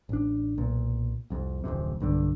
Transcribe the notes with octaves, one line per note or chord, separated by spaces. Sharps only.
A1 D4
B1 A#2
C2 F2
D1 A1 F2 C3
B1 G2 D3